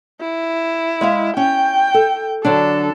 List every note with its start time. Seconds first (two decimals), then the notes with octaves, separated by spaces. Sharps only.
0.21 E4
1.01 G#3 E5 F5
1.37 C#4 G5
1.94 A4
2.45 D3 F#3 D4 A4